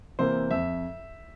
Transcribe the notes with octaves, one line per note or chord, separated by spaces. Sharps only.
C3 E3 A#3 C5
F2 E5